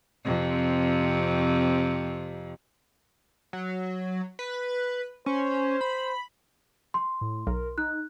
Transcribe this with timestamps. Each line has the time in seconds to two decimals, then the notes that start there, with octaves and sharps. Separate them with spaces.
0.25 F2 C3
3.53 F#3
4.39 B4
5.26 C#4 C5
5.81 B5
6.94 C6
7.21 A2
7.47 B1 A#4
7.78 D#4 F#6